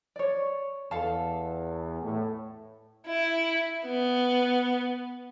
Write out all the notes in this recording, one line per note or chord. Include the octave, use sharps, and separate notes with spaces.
C#5 D5
E2 A4 F5 A5
A2
E4
B3